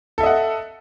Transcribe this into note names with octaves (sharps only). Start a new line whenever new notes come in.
A4 D#5 E5 F#5